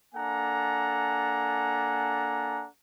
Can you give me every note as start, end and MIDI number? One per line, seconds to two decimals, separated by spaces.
0.15 2.66 58
0.15 2.66 62
0.15 2.66 69
0.15 2.66 78
0.15 2.66 80
0.15 2.66 82